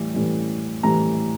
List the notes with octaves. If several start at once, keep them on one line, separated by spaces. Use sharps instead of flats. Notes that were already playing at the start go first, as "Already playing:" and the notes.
Already playing: A2 E3 G3
A2 E3 G3
A2 E3 G3 A#5